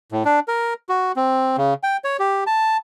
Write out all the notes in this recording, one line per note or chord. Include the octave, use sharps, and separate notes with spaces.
A2
D4
A#4
F#4
C4
C#3
G5
C#5
G4
A5